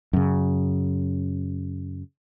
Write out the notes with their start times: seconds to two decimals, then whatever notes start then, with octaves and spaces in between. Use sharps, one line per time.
0.13 F#2 C#3